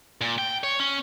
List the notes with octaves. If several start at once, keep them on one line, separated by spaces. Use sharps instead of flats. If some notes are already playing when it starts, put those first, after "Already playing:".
A#2
G5
C#5
C#4